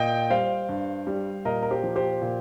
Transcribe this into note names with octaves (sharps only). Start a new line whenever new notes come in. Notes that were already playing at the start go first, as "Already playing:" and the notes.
Already playing: A#2 D#5 G5
G3 C5 F5
G2
G3
A#2 A#4 D#5
A#4
G4 C5
F3
G4 C5
A#2